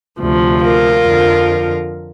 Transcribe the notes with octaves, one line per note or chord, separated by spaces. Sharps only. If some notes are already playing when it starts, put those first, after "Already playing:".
D2 C3 F3
F4 A#4
F2 D3 F3